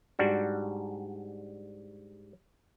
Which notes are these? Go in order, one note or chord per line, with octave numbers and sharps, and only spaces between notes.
G#2 G3 D4 F#4